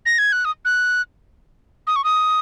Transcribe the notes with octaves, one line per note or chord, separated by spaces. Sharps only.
A#6
G#6
F#6
D#6
F#6
D#6
C#6
D#6